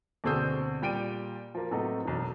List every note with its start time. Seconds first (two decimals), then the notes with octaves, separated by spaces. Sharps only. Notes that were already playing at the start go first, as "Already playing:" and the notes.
0.24 D2 B2 C4 G#4 E6 G6
0.82 A#2 G3 G5 D7 D#7
1.55 F3 A#3
1.71 A2 C3 F#3 A3 B3 D#4
2.05 E1 B1